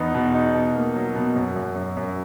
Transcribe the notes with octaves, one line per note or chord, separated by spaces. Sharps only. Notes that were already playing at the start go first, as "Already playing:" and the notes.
Already playing: E2 B3 D#4
B2
D#4
B2
A#3
F#3
B2
F#2
F#2
F#2
F#2